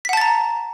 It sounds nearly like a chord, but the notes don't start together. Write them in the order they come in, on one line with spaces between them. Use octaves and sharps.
B6 F#5 A5 A6 A#5